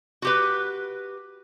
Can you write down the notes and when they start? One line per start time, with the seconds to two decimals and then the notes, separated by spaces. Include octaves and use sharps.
0.22 F#4 G4 B4